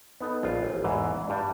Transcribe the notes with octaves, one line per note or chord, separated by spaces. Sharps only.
B3 D#4 A4
A#1 F4
A1
E2 G#2 E3
G2 G3 D4